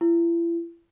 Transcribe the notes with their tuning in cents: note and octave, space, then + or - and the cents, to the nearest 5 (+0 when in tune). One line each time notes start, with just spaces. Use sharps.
E4 +40